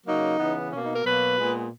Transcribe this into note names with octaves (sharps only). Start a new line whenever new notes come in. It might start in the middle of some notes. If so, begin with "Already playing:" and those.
C#3 F#3 A#3 D#4
C#3 E3 B3
B2 A#3 C#4
D#4
A#4
B2 F#3 A#3 B4
A#2 G#3 B3